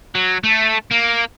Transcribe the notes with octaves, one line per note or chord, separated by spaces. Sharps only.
F#3
A3
A#3